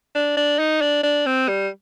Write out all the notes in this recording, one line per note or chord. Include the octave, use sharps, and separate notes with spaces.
D4
D4
D#4
D4
D4
C4
G3